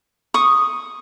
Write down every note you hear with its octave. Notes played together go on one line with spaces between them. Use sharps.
C#6 D#6